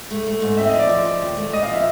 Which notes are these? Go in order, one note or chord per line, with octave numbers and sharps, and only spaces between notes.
A3
A3
G#2
C4 E5
D#5
F3
D5
F3
F3
D#2
A3
A#2 D#5
F5
F3 E5